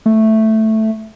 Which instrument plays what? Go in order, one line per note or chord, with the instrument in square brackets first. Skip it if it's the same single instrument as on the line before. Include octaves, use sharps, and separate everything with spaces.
[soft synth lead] A3